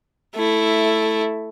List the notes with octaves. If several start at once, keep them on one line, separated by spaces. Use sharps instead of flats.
A3 E4